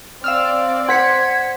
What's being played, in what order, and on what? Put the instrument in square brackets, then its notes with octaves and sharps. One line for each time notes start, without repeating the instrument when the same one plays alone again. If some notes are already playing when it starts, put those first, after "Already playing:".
[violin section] C4 D5 [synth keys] F5 E6 F6
[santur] C5 [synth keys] F#5 B6 C#7 [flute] G#6